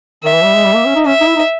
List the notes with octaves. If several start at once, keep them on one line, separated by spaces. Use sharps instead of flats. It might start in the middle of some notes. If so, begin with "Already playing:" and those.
D#3 E5
E3
G3
G#3
G3
A#3
C#4
D#4
C#4 E5
D#4
E4
D#4